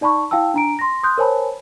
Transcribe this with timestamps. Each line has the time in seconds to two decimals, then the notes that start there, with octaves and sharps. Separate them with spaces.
0.01 D#4 D5 A5 B5 C#6
0.31 E4 F5 G5 A5 E6
0.54 D4 A#5 D7
0.79 C6 A#6
1.03 C6 D#6 F#6 G6
1.18 A#4 C5 C#5 G#5 A5 B5